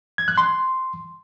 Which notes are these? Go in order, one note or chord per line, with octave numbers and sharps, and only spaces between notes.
G#6
F#6
C6